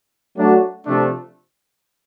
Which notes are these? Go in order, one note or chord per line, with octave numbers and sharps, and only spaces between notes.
F#3 A3 D4 F#4
C3 F3 A3 D4